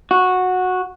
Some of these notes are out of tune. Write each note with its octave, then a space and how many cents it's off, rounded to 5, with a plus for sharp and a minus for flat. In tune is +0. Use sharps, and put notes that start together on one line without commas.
F#4 -10